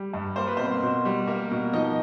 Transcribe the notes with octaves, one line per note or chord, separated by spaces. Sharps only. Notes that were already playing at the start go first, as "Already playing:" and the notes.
Already playing: G3
G2
A#3 C5
B4
B2 C4 C5
B2
G3
A#3
B2
F3 D#4 D#5